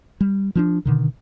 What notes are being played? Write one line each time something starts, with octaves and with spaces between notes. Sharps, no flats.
G3
F3 C#4 D4
B2 D3 D#3